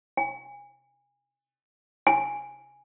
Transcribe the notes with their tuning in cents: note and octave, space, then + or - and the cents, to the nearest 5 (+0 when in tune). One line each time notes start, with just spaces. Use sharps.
G#5 -30
G#5 -5